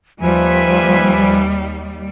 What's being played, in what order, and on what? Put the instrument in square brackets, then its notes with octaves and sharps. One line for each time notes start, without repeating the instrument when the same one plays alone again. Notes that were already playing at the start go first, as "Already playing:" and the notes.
[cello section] D#2 G3 [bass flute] F3 [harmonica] B4 E5 G#5